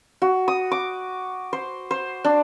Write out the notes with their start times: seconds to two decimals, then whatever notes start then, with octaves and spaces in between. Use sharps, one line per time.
0.22 F#4
0.48 D#6
0.71 D6
1.53 C5
1.91 C5
2.24 D4